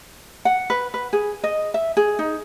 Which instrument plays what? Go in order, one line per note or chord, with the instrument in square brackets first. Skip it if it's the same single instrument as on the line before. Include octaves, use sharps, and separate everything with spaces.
[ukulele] F#5
B4
B4
G#4
D#5
E5
G#4
D#4